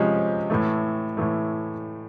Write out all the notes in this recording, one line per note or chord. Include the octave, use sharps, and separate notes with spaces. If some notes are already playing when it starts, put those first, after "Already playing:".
Already playing: C3 F3 G#3 C#4
A2 E3 A3
A2 E3 A3